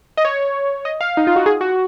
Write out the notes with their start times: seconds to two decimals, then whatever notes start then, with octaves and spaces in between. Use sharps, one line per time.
0.17 D#5
0.25 C#5
0.85 D#5
1.01 F5
1.17 D#4
1.27 F4
1.36 F#4
1.46 G#4
1.61 F#4